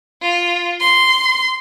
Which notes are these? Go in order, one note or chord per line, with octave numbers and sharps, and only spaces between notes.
F4
C6